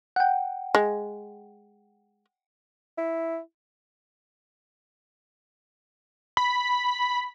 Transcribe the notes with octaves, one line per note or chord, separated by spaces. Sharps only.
F#5 G5
G#3
E4
B5